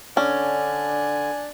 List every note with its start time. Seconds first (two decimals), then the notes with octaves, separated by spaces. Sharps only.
0.17 D3 C#4 D4 G#5